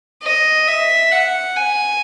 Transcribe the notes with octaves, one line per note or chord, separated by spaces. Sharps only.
D#5
E5
F#5
G#5